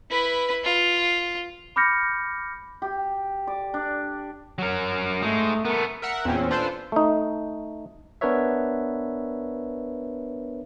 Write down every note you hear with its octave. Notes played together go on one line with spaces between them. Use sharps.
E4 B4
F4
B5 D6 F6 G6 A#6 C#7
G4
D5
D4
F#3 A#4
G#3 A3 D#4
A3 B3 A#4
A#4 E5 F#5
E2 A#2 C4 C#4
D4 F4 A4 B4 C5
A3 D#4
B3 D4 A#4 B4 C#5 E5